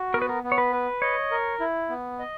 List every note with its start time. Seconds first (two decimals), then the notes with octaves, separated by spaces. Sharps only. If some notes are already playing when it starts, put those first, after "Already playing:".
Already playing: F#4
0.14 B3 A#4
0.22 B4
0.29 A#4
0.44 B3
0.52 C#5
0.58 B4
0.72 B4
1.02 C#5 D#5
1.31 A#4
1.60 E4
1.90 B3
2.19 D#5